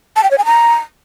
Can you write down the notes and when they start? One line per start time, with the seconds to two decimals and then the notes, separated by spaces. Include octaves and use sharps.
0.16 A5
0.24 G5
0.31 C#5
0.38 G#5
0.45 A#5